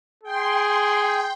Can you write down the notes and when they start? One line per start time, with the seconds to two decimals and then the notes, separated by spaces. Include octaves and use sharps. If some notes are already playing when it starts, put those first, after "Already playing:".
0.23 G#4 G5 C6
1.02 G5